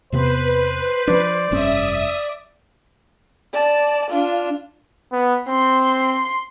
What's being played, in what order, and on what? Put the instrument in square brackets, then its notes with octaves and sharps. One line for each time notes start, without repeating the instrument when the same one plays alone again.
[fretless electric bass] E2 C3 B3 [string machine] B4 [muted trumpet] C5
[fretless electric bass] F3 D4 [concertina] D5
[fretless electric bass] F1 G2 C#4 [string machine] E5 D#6
[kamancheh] D5 A5
D4 F4
[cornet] B3
[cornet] C4 [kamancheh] C6